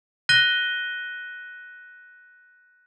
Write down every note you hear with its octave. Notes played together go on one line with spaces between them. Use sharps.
F#6 A#6 D#7 G7